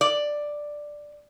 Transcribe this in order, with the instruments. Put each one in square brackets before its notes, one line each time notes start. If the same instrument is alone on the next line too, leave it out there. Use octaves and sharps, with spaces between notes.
[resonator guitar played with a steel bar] D5